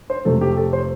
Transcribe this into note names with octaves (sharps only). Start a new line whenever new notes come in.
C5
F2 C3 A3 A4
G4
A4
C5